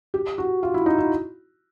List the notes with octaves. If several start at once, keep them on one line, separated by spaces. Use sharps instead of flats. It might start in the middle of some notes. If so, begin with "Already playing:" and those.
G4
F#4
F4
E4
D#4
E4